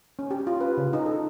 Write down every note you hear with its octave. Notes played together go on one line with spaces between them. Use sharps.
C#4
G4
F4
B4
C#3
D#4
A4